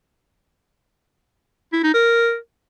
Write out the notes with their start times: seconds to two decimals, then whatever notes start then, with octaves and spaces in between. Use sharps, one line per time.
1.73 E4
1.83 D#4
1.94 A#4